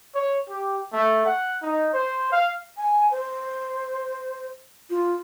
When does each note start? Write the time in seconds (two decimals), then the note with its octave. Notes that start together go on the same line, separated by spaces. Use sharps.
0.13 C#5
0.48 G4
0.93 A3
1.25 F#5
1.62 D#4
1.93 C5
2.32 F5
2.77 G#5
3.11 C5
4.90 F4